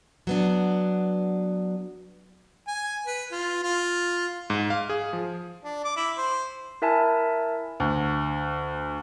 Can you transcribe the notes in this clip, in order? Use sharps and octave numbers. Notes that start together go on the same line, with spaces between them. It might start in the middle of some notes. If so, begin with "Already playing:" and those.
F#3 B3 D4
G#5
B4
F4
F4
G#2
F5
G#4
F3
D4
D6
E4
C5
E4 A#4 E5 G#5 A5
D2